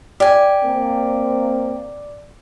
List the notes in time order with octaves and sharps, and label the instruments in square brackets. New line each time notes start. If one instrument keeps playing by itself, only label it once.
[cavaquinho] G4 G#5 [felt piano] D5
[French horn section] A#3 C4